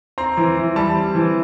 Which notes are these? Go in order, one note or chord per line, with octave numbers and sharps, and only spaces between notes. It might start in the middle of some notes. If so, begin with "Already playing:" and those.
C4 A#5 C6
E3
E3
G3 A5 B5
C4
E3